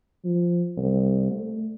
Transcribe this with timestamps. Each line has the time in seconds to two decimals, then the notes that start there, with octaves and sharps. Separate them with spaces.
0.24 F3
0.77 C2
1.31 A3